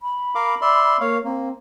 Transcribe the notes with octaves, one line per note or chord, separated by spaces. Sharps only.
B5
A#4 F5 D6
D5 E5 C6
A#3 C#5 F5
A#3 C4